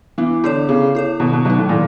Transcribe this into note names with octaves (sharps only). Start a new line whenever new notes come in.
E3 B3
D3 E4 A4 C#5
C#3 B3
E4 A4 C#5
B2 D#3
B2
B2 F#3 B3 D#4
A2
A#2 D#3